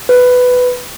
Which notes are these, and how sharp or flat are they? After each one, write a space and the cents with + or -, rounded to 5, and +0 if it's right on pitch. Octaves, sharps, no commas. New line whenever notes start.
B4 +10